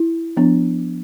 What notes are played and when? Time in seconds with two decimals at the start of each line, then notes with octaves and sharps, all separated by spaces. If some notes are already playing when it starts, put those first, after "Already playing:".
Already playing: E4
0.37 F3 B3 D4